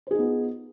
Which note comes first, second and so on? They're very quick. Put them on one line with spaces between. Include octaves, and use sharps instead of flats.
C5 G#4 D#4 B3 F4